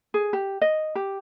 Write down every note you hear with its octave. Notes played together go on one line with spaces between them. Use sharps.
G#4
G4
D#5
G4